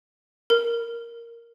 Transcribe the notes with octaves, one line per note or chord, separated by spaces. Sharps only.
A#4